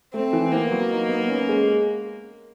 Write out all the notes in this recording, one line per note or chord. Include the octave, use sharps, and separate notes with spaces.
A3 C4
E3
A#3 B3
F#3
D#4
B3
C#4
G#3